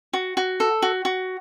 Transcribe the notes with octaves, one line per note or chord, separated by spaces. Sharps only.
F#4
F#4
A4
F#4
F#4